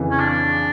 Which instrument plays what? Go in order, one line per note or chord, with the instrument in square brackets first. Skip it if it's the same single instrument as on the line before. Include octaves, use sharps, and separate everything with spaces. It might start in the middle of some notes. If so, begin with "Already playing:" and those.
Already playing: [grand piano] F2 C#3 E3
[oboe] C#4
D4